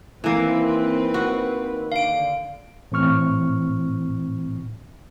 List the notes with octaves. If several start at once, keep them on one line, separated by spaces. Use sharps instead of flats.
D#3 E3 A#3 C4 B4
F#4
D3 F5 D7
A2 E3 C4 C#6 F6